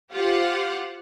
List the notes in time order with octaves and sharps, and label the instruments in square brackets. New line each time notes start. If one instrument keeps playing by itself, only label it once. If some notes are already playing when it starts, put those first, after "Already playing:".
[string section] F4 G4 C5 F5 F#5